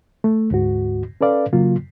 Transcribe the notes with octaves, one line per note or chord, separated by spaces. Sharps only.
A3
D2 G#2 F#4
C#4 A4 B4 D5 F5
C#3 F#3 A#3 F4